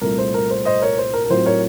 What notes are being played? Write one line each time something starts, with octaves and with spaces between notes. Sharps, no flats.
C2 A#2 A3 A#4
C5
A#4
C5
C5 D#5
A#4 C#5
C5
A#4
A#4
A2 F#3 C4 F4 C5
A#4 C#5